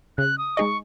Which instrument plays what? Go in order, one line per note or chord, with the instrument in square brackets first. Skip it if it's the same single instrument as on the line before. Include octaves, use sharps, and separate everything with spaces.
[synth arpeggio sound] C#3 [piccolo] F#6
[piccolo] D#6
[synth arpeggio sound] G#3 D#4 G#4 D#5 [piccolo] C#6